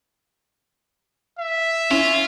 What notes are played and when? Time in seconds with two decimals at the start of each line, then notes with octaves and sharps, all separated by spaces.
1.39 E5
1.91 C#4 E4 F4